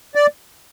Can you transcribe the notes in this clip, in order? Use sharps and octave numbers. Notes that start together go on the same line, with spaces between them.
D5